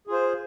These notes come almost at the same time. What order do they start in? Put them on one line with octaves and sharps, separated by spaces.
G#4 F4 C5